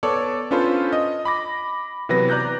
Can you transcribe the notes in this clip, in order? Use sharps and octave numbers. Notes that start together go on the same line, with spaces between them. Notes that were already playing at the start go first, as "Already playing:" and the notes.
B3 A4 C#5 D5
C#4 D4 F4 A4 B4 C5
D#5
B5 D6 A#6
C3 E3 F#3 B3 B4 A#6
D5 A#5 F#6 G6 A#6